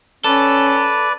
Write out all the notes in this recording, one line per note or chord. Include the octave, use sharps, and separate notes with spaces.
C#4 A4 B4 D5